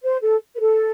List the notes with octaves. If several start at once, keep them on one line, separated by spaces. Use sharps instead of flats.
C5
A4
B4
A4